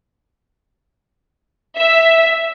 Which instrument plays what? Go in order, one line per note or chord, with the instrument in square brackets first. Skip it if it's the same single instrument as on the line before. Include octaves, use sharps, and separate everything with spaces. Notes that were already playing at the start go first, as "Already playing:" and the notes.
[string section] E5